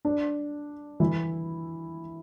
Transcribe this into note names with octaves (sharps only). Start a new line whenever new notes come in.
D4
E3 E4